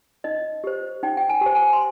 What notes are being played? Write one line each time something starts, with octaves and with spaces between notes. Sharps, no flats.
D#4 D#5
G4 C5
D#4 G5
G5
G#5
G4 C5
G#5
C6